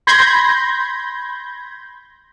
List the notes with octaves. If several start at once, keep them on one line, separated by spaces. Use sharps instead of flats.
B5 C6 G6 G#6 A#6